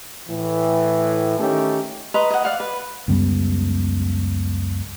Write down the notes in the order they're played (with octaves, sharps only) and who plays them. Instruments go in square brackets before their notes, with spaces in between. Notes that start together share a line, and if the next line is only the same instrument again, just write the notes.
[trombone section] A2 E3
D#3 A3 C#4 G4
[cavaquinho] B4 D#5 A#5 C6
D#5 F#5
D5 F5 F#5
B4
[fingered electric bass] C#2 F#2 G3 B3